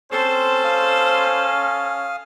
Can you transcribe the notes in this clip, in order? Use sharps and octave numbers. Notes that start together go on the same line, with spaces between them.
C4 C#4 A4 C5
F5 D#6